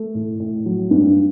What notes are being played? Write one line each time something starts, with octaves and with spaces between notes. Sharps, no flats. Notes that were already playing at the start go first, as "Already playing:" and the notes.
Already playing: A3
A2
A2
F#3
G2